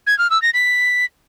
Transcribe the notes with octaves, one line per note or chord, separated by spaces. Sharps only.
G#6
F6
E6
A#6
B6